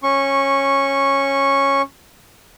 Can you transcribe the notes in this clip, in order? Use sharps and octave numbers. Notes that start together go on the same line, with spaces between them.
C#4 C#6